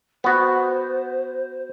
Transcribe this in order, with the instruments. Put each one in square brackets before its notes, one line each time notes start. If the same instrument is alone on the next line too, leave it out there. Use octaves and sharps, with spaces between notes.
[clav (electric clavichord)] B3 F#4 [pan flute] C5